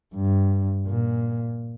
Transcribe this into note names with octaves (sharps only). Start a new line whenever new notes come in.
G2
A#2